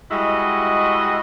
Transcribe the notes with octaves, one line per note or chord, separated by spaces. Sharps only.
G3 G#3 E4 F#4 D#5